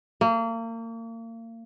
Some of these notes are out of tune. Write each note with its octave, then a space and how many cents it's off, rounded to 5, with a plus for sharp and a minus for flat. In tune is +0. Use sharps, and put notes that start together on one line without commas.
A#3 -35